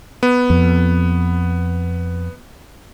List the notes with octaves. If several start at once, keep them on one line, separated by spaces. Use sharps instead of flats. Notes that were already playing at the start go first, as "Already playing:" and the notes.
B3
F2